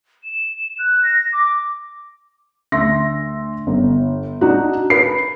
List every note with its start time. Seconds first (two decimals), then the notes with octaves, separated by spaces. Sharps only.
0.24 E7
0.78 F#6
1.03 A#6
1.32 D6
2.72 D2 E5 C6 A#6
3.67 G1
4.41 D4 D#4 F#4
4.90 A#4 B4 C7